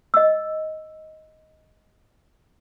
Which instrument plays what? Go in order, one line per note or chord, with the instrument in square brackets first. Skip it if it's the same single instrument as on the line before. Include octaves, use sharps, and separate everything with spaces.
[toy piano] D#5 E6